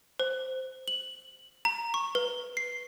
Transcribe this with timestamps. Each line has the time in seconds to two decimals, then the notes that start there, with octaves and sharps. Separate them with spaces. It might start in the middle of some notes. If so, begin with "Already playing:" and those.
0.20 C5
0.88 F#7
1.65 A#5
1.94 C#6
2.15 B4
2.57 C7